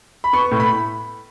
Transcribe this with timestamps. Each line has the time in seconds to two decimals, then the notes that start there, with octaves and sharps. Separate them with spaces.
0.24 B5
0.33 B3 C#6
0.51 A2
0.60 B5